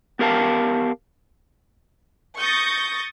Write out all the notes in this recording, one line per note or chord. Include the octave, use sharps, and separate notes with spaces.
B3 G4 A#4 F5 A5
C#6 D#6 G6 A6 A#6